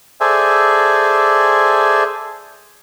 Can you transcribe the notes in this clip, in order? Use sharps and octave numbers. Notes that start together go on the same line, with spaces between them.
G#4 A4 C5 D5 E5 G#5